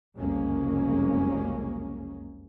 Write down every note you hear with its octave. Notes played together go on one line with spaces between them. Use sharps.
F#1 C2 F2 G#3 A#3 C#4